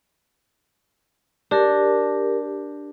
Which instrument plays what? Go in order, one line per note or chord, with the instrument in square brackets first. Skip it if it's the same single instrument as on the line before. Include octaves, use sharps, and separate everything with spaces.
[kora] D4 [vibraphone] G4 A#4